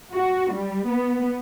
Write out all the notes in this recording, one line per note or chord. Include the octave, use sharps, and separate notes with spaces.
F#4
G3
B3